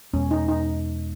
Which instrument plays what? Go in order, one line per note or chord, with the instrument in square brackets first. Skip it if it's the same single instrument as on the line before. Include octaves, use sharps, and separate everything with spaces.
[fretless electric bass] E2 B2 G#3 B3 [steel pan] C#4
[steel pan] D#4
D#4